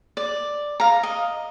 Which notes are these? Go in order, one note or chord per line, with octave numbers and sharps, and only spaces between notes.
D5
F5 A#5
D#5